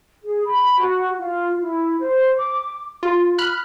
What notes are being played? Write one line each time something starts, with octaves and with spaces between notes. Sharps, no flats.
G#4
B5
F#4
F4
E4
C5
D6
F4
B5 F6 F#6